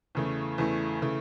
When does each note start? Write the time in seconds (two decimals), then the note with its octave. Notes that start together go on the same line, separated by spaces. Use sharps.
0.15 E2 C#3 E3 A3
0.58 E2 C#3 E3 A3
1.02 C#3 E3 A3